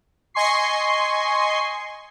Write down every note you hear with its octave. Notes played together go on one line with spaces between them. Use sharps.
D#5 G#5 C6 C#6 C7